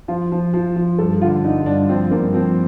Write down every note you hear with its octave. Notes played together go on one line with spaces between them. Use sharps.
F3 F4
F3
F3
F3
G2 A4
D3 F4
D3 D#4
G2 D4
F3 C4
G2 A#3
F3 C4